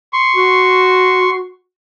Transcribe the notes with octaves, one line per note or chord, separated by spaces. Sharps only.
C6 C#6
F#4